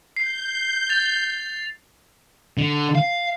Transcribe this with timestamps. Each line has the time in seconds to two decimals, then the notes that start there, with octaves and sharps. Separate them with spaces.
0.16 G6 C7
0.89 A6 F7
2.58 D3
2.95 F5